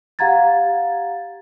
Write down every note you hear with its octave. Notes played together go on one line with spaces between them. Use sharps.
G4 F5 F#5 A#5 G#6 A6